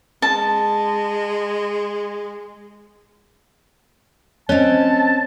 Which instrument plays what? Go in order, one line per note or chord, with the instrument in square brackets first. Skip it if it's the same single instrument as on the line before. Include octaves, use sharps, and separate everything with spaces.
[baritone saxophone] G#3 [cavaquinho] A5
[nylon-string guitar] C4 C#4 [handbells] C#5 D#5 [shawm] A5